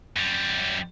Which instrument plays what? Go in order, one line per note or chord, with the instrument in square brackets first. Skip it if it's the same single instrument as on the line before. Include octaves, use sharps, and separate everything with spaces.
[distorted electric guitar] F#2 G3